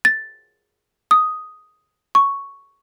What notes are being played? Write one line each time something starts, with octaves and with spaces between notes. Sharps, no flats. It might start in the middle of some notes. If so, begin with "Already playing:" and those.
A6
D#6
C#6